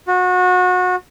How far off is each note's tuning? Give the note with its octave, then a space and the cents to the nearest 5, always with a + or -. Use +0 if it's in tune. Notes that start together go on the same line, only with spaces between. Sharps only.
F#4 -25